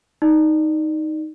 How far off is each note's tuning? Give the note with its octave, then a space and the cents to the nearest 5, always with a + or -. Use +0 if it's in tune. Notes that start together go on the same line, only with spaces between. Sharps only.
D#4 +0 D5 +20